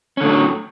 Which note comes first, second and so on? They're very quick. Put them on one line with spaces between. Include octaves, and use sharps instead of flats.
C#4 D3 A2 F#3